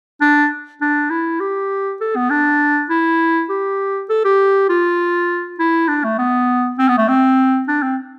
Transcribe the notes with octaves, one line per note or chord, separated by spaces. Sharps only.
D4
D4
E4
G4
A4
B3
D4
E4
G4
A4
G4
F4
E4
D4
A3
B3
C4
B3
A3
C4
D4
C4